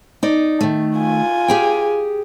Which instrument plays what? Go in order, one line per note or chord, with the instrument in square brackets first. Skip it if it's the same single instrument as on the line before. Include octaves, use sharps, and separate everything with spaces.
[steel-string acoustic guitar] D#4 D5
D#3 A3
[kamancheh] F4 G#5
[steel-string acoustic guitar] G4 G#4 G5